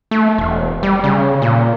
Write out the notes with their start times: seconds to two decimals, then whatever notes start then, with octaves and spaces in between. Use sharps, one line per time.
0.11 A3
0.38 E1
0.83 G3
1.04 C#3
1.42 A#2